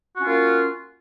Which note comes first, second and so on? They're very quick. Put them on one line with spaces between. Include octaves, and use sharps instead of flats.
F#4 C#4 F4 A#3